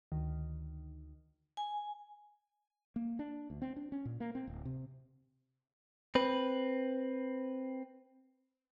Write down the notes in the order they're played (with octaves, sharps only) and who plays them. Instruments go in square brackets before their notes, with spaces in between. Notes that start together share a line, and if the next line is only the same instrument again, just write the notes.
[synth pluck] D2 D#3
[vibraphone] G#5
[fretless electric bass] A#3
D4
D2
C4
D4
C#4
A#2
A#3
C4
D1
C3
[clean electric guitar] C4 B4